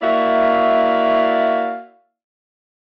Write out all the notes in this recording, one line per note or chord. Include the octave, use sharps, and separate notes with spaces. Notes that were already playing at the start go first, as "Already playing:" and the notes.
A#3 E4 F#4 D5 E5 F5